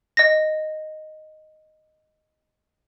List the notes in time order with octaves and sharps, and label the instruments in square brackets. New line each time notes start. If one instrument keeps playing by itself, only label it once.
[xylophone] D#5 A#6